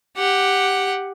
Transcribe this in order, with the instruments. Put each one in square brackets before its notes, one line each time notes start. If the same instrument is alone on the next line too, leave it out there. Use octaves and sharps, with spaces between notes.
[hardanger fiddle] G4 F#5